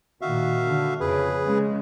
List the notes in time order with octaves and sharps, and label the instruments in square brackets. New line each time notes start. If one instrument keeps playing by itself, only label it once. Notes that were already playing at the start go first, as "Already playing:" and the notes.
[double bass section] A#2 D#3 [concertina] F#4 E5 F5
[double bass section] D3
[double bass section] F2 C#3 [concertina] G#4 B4
[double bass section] C#3 G#3